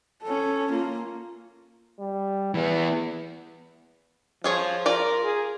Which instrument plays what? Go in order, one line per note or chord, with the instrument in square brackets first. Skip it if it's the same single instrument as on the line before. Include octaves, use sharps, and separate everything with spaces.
[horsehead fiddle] C#4 A4
A#3 F4
[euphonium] G3
[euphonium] E2 [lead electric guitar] E3 B3
[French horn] F3 [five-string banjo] F4 G#4 C#5
[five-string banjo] F4 D5 [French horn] A#4
[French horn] G#4